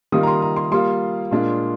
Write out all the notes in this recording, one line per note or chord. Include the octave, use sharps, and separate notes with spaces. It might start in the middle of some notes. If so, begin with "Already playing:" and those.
D#3 G3 A#3 F4 D#6
A#5
C6
A#5
C6
G3 A#3 F4 C6
A#2 G#3 D4 F4